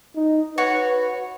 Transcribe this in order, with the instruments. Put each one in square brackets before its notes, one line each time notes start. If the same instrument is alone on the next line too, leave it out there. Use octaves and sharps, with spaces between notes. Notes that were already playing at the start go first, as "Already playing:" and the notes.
[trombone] D#4
[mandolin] F#4 C#5 [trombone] B4